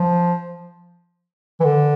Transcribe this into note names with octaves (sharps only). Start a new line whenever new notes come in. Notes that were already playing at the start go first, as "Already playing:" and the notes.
Already playing: F3
E3
D3